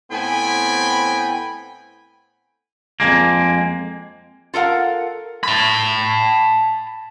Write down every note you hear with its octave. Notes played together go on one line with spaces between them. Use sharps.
A2 B3 C4 G5 G#5 B5
F2 G#2 G#3 A#3
F4 A4 A#4 F5 F#5
A5 B5